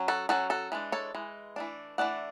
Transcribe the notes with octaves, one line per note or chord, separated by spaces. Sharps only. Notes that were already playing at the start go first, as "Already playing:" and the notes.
Already playing: F#3 C#4
F#4 A4
F#3 C#4 F#4 A4
F#4 A4
E3 G#3 D4
A4 C#5
E3 G#3
E3 A3 D4
E3 A3 D4 D5 F#5